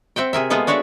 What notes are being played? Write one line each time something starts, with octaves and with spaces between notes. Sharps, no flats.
C4 E5 F#5 G5
C3 G#4 A#4 E5
G#3 A#3 B3 F4 G#4 A4
D4 F#4 C#5 D5 E5